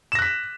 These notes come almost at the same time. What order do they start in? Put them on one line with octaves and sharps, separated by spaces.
E7 A#6 F#6 B6